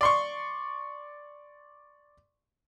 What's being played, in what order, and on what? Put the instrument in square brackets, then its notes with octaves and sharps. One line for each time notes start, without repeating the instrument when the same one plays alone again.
[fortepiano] D5 C6 C#6